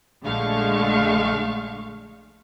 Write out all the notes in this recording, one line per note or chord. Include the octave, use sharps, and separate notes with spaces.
A#1 D3 G#3 A3 F5 C#6